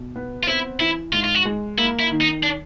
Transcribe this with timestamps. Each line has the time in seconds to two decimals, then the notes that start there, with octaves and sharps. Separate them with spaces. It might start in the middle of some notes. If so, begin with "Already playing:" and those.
Already playing: B2
0.16 B3
0.43 F4
0.47 C4 E4
0.80 E3 E4
1.13 G#2 F4
1.24 F4
1.35 F#4
1.45 G#3
1.78 A#3 E4
1.99 E4
2.11 D#3
2.21 D#4
2.43 D4